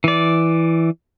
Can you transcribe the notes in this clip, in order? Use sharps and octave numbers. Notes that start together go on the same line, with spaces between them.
E3 D5